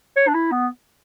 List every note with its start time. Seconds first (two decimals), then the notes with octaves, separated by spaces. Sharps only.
0.16 C#5
0.28 D4
0.34 E4
0.52 B3